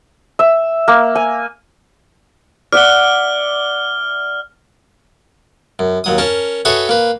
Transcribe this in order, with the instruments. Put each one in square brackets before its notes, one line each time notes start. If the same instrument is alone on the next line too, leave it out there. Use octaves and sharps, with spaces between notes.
[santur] E5
A#3
G#5
[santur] D5 E5 F#5 [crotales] F6 G7
[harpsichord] F#2
D#2 F#3 D#6
C#4 A#4 A5
F#4 G#4 A4 B4 C#5 E5
A#3 B4